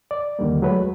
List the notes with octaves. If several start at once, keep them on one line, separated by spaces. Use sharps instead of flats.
D5
D#2 D3 D#3 G3 A#3
F#3 G#3 A3 B4